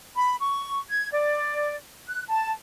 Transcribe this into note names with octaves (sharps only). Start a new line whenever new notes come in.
B5
C#6
G#6
D5
F#6
A5